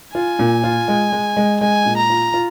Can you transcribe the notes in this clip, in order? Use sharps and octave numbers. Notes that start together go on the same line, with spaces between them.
F4 G#5
A#2
F4
G#3
G#3
G#3
G#3 G#5
A#2
A#5
F4
F4